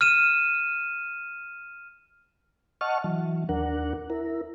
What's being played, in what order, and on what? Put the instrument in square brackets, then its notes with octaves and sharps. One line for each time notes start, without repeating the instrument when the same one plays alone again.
[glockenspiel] F6 D#7 E7
[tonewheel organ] D#5 F#5 A5 C#6 F6
E3 F#3
D#2 D4 A#4 F#5
E4 A#4